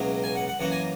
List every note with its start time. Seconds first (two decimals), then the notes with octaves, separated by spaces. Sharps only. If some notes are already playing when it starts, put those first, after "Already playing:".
Already playing: C#2 B2 F#3 A#3 E4
0.24 G#5
0.35 F#5
0.48 F#5
0.60 F#2 E3 A#3 F#5
0.72 G#5